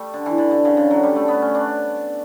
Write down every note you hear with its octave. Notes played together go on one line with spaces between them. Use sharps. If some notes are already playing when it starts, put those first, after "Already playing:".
Already playing: G3 A3
D3
E3
D3
D3
C#3
D3
F#3
G3
A3
B3
C#4
D4